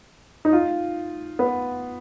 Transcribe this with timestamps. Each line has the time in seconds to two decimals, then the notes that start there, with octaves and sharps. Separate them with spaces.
0.45 D#4
0.53 F4
1.39 B3